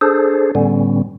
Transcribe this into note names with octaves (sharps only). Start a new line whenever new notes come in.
D4 G#4 A4 C5
A2 D3 G3 B3 C#4